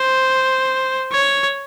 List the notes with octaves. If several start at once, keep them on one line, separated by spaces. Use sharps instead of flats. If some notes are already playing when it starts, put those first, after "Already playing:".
Already playing: C5
C#5